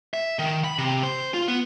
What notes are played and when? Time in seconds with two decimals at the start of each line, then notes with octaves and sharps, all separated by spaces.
0.14 E5
0.39 D#3
0.64 B5
0.78 C3
1.03 C5
1.34 F4
1.48 B3